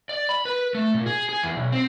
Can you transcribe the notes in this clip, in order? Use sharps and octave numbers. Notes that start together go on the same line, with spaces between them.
D5
B5
B4
A3
A#2
G#4
G#4
E2
B1
C4